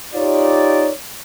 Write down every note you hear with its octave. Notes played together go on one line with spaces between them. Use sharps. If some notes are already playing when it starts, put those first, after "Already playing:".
D#4 F4 G4 C#5 D5